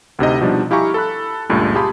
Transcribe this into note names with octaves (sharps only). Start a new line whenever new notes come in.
D2 C3 D#4 D#5
B2 F3 G3 D4 D#4
E4 G4 F5 G#5 A#5 C#6
A4 B5 F#6
C#2 G2 A#2 A3
G4 G#4 F5 A5 B5 C6